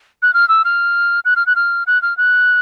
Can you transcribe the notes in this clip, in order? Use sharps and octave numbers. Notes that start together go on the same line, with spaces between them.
F#6
F6
E6
F6
F#6
F6
F#6
F6
F#6
F6
F#6